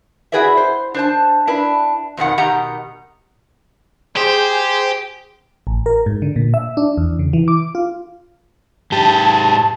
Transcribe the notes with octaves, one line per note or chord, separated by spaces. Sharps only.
E4 F#4 G#4 B4 D5 E5
C5
D4 C5 A5
D4 E4 B4
F2 B2 D#3 F#5
B2 D#3 G4 D#5 F#5 A#5
G4 G#4 C5
A1
A#4
G#2
D3
A#2
E5
D4
E2
C#3
E3
D6
F4
G#2 G4 A5